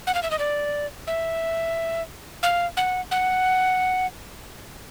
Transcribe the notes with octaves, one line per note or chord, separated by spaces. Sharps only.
F#5
F5
E5
D#5
D5
E5
F5
F#5
F#5